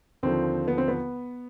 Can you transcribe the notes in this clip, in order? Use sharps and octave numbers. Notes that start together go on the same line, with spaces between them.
D#2 D3 F3 C4
B3
C4
B3